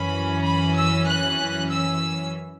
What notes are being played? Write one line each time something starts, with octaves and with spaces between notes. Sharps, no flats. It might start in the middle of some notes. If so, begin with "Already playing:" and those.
Already playing: F#2 E3 C#4 B5
B5
E6
F#6
E6